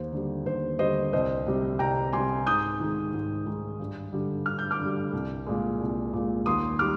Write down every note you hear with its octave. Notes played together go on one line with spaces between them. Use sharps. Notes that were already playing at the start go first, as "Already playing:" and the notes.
Already playing: D#2 C5
D3 G3
D#2 C5
D3 G3 C5 D#5
C2 C5 D#5
C3 G3
C2 G5 A#5
C3 G3 G#5 C6
G#2 D#6 G6
D#3 G#3
G#2
D#3 G#3
G2
D3 G3
G2 F6
G6
D6 F6
D3
G3
C2
A#2 G#3
C2
A#2 G#3
D#2 C6 D#6
D#3 G3 D6 F6